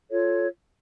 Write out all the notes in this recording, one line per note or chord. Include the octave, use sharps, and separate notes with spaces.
F4 A4 C#5